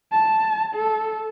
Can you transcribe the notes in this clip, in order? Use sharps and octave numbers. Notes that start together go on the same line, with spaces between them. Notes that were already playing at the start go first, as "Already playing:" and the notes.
A5
A4